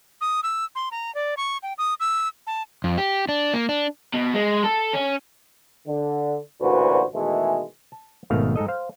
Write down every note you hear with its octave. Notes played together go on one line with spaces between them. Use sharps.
D#6
E6
C6
A#5
D5
C#6
G5
D#6
E6
A5
F2
G4
D4
A#3
D4
B2
G#3
A4
C#4
D3
A1 D2 A#2 F#4 B4 C5
B2 D#3 E3 G#3 A3 G#4
A5
G#1 B2 D#3 A3 F5
G#2 D#4 A4 D#5
C5 F5